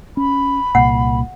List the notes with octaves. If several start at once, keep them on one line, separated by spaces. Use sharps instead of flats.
C#4 B5
C2 A#2 F#5